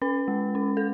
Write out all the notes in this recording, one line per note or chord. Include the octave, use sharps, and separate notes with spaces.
C#4 B4
G#3
C#4
A4